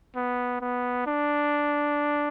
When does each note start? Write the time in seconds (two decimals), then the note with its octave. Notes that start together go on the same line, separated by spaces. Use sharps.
0.16 B3
0.61 B3
1.07 D4